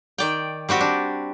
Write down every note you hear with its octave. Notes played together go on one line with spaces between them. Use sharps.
D#3 D5 G5
G3 C4 F#4 G4
D4